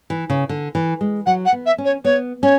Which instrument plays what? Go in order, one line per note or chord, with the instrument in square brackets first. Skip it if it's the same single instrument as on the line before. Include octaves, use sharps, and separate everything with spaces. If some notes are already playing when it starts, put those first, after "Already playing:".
[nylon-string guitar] E3
C#3
D3
E3
G#3
[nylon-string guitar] F#3 [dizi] F#5
[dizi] F#5
[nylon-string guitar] B3
[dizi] E5
[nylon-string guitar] C#4
[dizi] C#5
[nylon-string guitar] B3 [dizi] C#5
[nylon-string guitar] C#4 [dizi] C#5